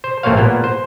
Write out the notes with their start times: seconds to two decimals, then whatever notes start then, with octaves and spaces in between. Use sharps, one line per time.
0.04 C5
0.23 A1 A3 A#3 C5 C#5 F5
0.37 A#2 A#3 B3
0.64 C5